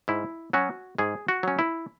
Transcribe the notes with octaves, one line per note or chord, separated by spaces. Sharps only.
G#2 E4
F#3 C#4 F#4
G#2 G#4
F#4
F#3 C#4
E4